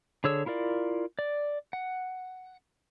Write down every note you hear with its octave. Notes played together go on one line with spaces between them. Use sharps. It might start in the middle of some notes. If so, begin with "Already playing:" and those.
D3 G#4 C#5 E6
E4 F4 A#4 D5
D5
F#5